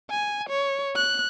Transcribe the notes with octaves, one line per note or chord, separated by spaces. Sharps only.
G#5
C#5
F#6